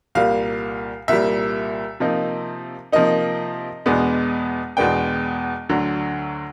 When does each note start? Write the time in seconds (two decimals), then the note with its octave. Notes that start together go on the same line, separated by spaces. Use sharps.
0.15 C2 A#2 G3 F5
1.08 C2 A#2 G3 E5
2.00 C3 F3 A#3 D#4
2.92 C3 F3 A#3 D#4 D#5
3.86 E2 B2 G#3 B3 D4
4.77 E2 B2 G#3 B3 D4 G5
5.69 D2 D3 F#3